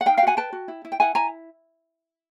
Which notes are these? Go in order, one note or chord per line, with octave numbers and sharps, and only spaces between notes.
F#5
D#4 F5 G5
F5 G5
F#4 F#5 G#5
B4 G5 A5
F#4
E4
E4
G5
E4 F#5 G#5
E4 G#5 A#5